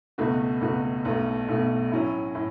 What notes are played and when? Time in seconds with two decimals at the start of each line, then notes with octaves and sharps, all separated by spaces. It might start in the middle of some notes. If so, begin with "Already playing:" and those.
0.18 C#2 B2 A3 F#4
0.61 C#2 B2 A3 F#4
1.05 B1 B2 A3
1.49 B1 B2 A3
1.92 A2 F#3 C#4 E4
2.35 A2